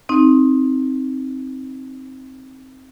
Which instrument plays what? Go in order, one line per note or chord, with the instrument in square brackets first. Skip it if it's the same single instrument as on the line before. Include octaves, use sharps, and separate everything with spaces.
[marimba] C4 D#4